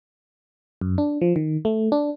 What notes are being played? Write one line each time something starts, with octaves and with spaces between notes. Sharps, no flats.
F#2
D4
F3
D#3
A3
D4